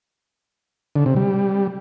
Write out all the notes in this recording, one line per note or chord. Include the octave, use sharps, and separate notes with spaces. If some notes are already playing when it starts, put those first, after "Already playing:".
D3
C3
G3